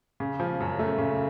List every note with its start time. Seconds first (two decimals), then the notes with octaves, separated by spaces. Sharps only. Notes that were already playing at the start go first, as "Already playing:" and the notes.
0.20 C#3
0.40 F3
0.60 F#2
0.79 A3
0.98 C#3